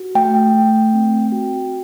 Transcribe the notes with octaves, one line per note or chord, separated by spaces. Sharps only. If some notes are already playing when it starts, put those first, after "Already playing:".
Already playing: F#4
A3 G5
A3
C4
F#4